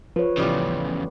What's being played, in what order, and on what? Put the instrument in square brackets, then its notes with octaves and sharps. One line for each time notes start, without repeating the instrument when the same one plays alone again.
[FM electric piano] F3 [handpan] B4 C#5
[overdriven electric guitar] E2 C#3 [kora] A2 G3 F4